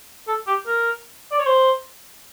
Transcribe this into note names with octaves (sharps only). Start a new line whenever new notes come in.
A4
G4
A#4
D5
C#5
C5